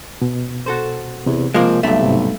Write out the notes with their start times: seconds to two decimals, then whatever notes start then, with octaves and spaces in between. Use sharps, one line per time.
0.22 B2
0.66 F#4 A4 C5
1.26 E2 C3
1.54 F3 G#3 A#3 C4
1.83 B1 G2 A3 E5
2.01 G#2 C3